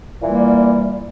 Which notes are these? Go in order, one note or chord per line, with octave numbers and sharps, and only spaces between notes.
A#2 E3 G3 A#3